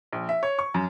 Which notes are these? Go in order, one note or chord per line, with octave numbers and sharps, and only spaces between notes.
A#1
E5
C#5
C#6
F#2